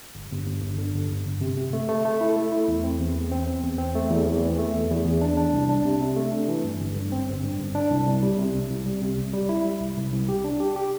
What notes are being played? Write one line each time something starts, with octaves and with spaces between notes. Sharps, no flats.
G1
G1
G1
G1
D3
G1
G1
G1
C3
C3
A3
A3
A3
E4
A3
E4
E2
C4
E2
E2
C4
C4
E2
C4
A3
E2
E2
E3
A3
E2
E2
E2
D4
D4
C2
D4
C3
C3
A3
D4
E3
G2
G1
G2
C4
G1
G2
G1
D4
C2
C2
G3
C3
C2
C2
G3
C3
C2
G3
E4
G3
C2
C2
C2
G4
D4
G4
G4